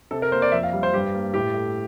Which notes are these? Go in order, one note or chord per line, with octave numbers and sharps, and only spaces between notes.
C3 A4
A#4
A#3 C5
D5
F2 E5
F5
G3
C5
G2 G4
A#3
A2 G4
A3